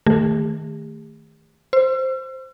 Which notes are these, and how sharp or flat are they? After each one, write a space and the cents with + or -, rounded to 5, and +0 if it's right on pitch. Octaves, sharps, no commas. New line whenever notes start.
D#3 +0 A3 +0 G4 +45
C5 +0 E6 +45